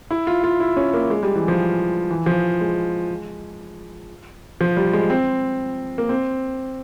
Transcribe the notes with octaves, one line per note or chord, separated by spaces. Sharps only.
E4
F4
F4
E4
C#4
A#3
G#3
G3
E3
F3
E3
F3
G#3
F3
G3
G#3
C4
A#3
C4